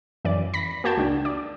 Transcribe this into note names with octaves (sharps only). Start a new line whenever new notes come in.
F#2 E3 D5
B5 A#6 B6
A#3 F#4 G5 A5 G#6
C#2 D4
D5